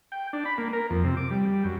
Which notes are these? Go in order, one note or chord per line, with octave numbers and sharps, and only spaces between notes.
G5
D4
B5
A#3
A#4
F2
C3
D6
G3
G3
F#2